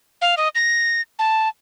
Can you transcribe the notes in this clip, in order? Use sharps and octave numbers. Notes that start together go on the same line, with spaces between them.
F5
D#5
A#6
A5